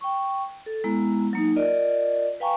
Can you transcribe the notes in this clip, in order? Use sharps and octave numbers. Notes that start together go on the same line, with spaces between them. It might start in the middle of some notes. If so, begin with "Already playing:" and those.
G5 C#6
A4
G#3 B3 E4 A#5
F#3 A#3 D#4
F4 A#4 D5 D#5
B4 F5 G5 G#5 A#5 C#6